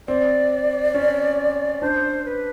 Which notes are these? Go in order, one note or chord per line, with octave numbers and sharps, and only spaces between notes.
C4 D5
C#4
D4 C5
B4